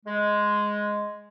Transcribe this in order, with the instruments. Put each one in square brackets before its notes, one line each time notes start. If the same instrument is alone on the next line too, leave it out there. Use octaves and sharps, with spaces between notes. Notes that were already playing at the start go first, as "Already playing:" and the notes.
[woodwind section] G#3